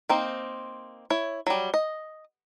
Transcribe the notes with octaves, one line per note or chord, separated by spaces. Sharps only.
A#3 C4 D#4
E4 C#5
F#3 G3
D#5